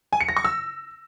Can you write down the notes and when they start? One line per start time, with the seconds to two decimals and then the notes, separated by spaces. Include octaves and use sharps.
0.13 G#5
0.21 C#7
0.29 A#6
0.37 C#6
0.45 E6